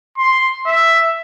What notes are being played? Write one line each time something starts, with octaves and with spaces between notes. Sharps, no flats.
C6
E5